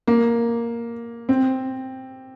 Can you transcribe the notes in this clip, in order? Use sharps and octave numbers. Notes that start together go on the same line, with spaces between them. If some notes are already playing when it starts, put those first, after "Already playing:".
A#3
C4